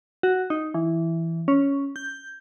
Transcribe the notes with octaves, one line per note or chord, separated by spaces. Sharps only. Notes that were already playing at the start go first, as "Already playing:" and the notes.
F#4
D#4
E3
C#4
G6